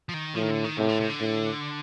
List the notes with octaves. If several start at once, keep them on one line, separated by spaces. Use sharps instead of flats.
F3
D#3
A2 F3
D#3
D3
D#3
A2 C3
D3
C3
D3
A2